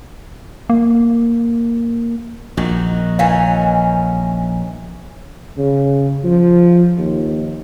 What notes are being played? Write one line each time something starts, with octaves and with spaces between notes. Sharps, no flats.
A#3
A#1 D#3 F#4
D#3 E3 C#4 F5
C#3
F3
D#2